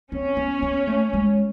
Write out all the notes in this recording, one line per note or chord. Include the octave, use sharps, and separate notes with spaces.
C4 C#4
B3
B3
A3
G#3